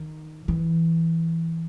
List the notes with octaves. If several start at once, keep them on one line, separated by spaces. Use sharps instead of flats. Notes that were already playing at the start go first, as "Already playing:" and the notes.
Already playing: D#3
E3